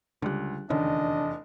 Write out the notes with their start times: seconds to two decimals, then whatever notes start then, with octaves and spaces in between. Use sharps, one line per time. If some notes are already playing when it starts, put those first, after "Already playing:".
0.22 C#2 D3 G3 F#6
0.70 F1 E2 D3 D#3 C#4 D4 D#5